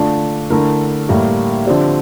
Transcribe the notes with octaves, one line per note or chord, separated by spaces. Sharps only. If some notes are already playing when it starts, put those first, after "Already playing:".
Already playing: D3 A3 D4 F4
D3 A3 E4 A#4
A2 G3 A#3
D3 F3 C4 G4 D5